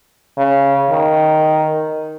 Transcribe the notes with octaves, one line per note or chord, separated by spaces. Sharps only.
C#3
D#3